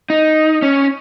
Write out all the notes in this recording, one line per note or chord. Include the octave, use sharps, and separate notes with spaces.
D#4
C#4